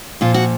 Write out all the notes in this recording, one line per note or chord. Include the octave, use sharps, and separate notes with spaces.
A#2 F3 F4
F#4